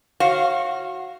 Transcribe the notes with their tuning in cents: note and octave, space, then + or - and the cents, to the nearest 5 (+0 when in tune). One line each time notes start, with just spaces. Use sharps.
F#4 +0 C#5 -35 F5 -10